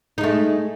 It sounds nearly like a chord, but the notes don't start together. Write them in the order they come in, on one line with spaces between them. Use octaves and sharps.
D#4 G#3 A3